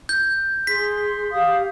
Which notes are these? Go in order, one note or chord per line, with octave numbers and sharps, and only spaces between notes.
G6
G#4 C6 B6
G4 F5 D#6